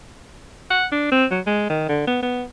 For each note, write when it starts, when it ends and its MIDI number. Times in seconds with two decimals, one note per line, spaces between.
0.70 0.86 78
0.92 1.07 62
1.12 1.25 60
1.31 1.40 54
1.47 1.69 56
1.69 1.84 51
1.89 2.05 50
2.07 2.18 59
2.22 2.44 59